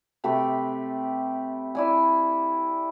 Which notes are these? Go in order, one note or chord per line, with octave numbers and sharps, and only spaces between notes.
C3 A3 G4 B4
E4 D5 G#5